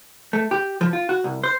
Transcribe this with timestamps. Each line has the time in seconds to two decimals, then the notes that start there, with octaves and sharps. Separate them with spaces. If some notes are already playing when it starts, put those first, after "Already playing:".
0.33 A3
0.51 G4
0.81 F3
0.93 F4
1.09 F#4
1.24 C2
1.44 C5